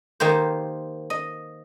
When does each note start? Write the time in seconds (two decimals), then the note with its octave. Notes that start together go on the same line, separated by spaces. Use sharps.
0.20 D#3 A#3 G4 C5
1.10 D#5